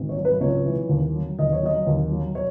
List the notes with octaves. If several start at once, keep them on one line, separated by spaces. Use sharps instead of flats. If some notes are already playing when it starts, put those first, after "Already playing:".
Already playing: G#1
C#5
F#3
B4
C#2 C#5
E3
D#2
F#3
D#2 D#5
C#5
F#3 D#5
D#2
F#3
C#5